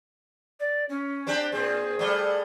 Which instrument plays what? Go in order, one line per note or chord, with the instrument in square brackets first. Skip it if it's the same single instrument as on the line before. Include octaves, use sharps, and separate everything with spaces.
[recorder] D5
C#4
[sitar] C4 D4 G4
[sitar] A#2 C4 [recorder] G#4
[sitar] G3 A3